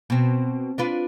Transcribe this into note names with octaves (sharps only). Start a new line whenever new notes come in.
B2 C4
D4 F4 B4